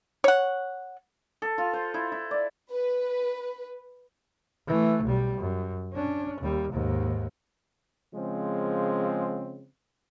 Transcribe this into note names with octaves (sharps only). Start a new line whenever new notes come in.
C#5 F#5
A4
F4
C5
E4
E4
D5
B4
E3 A3
B1 G3
F#2
C#4 D4
D#2 G3
D#2 G#2
C#3 F3 G#3 C4